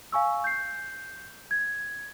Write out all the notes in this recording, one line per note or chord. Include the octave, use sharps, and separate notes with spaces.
F5 G#5 C#6 E6
G6 C7
G#6